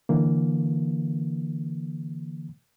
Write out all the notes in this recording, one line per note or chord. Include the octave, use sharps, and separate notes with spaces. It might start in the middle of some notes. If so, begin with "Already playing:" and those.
D3 E3 A#3